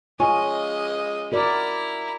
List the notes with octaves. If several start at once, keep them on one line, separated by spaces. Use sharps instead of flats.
G#3 C#4 F4 D#5
E4 F#4 A#4 D5 A#5